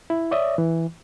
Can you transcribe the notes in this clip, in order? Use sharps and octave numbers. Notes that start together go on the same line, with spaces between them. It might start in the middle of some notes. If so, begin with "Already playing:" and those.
E4
C#5 D5 E5 D#6
E3